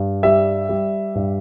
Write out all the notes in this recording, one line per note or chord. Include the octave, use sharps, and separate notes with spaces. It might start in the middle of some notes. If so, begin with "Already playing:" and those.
Already playing: G2
G3 E5
G3
G2